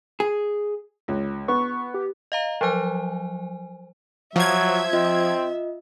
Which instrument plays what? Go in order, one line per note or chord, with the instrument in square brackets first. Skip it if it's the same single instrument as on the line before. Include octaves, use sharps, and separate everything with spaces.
[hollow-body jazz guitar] G#4
[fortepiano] C#2
[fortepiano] B3 [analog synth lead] C#6
[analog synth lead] G4
[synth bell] D#5 F5 A#5
F3 F#3 C5 G#5
[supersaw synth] F3 G#6 [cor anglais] F#3 [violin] E5
[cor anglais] C4 [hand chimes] F4 D#5